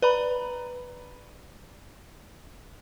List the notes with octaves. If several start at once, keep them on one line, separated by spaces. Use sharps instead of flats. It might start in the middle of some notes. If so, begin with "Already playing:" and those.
B4 D5 A#5 B5